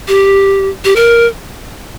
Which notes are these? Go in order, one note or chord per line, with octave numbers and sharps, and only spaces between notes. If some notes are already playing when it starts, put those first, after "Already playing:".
G4
G4
A#4